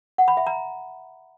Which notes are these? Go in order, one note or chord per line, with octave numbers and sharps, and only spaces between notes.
F#5
B5
E5
A#5